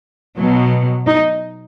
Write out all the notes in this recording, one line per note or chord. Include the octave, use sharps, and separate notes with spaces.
B2 F#3
D#4